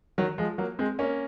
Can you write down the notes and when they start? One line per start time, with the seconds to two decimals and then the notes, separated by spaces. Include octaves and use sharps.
0.18 D#3 F#3
0.38 F3 G#3
0.58 F#3 A#3
0.79 G#3 C4
0.99 A#3 C#4